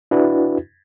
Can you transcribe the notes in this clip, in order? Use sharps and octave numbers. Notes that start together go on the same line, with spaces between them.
D4 E4 F#4 B4